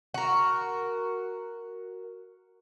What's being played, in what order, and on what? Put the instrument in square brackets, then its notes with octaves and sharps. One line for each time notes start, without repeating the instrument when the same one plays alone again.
[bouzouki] F#4 A#4